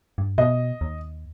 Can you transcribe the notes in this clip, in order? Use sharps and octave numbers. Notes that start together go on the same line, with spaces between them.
G2
B2 D#5
D#2